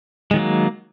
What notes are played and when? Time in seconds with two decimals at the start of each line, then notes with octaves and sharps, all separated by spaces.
0.31 G#3
0.34 D#3
0.36 F#3
0.39 A#3